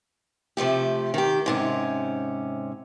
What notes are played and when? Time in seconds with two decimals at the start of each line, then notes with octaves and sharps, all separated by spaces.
0.57 C3 F3 A3 G4
1.14 D#3 G4
1.46 G#2 C3 C#4